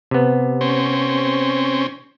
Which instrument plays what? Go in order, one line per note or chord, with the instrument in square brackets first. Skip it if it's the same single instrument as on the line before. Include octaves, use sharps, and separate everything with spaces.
[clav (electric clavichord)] C3 B3
[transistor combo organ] C4 C#4